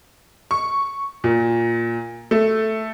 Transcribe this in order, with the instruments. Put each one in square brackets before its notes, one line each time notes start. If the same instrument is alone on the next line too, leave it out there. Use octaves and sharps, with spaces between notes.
[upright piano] C#6
A#2
A3